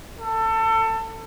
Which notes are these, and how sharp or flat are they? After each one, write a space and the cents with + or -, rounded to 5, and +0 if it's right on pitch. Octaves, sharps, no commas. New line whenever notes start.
A4 +25